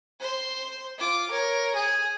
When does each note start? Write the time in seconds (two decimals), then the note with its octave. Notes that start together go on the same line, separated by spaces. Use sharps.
0.20 C5 C6
0.98 F4 D6
1.31 A#4 C#5
1.75 G#4